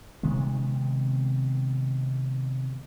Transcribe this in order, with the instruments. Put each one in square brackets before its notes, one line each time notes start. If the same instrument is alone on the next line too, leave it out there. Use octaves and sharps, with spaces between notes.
[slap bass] C3 D#3 G#3 B3